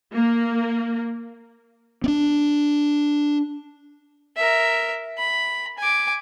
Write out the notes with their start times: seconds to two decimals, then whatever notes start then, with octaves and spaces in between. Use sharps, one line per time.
0.14 A#3
2.04 C4 D4
4.37 A#4 E5
5.18 B5
5.78 G#5 D6